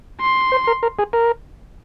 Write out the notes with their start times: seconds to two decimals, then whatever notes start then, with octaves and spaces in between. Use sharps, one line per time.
0.21 C6
0.52 C5
0.67 A#4
0.83 A#4
0.99 G#4
1.13 A#4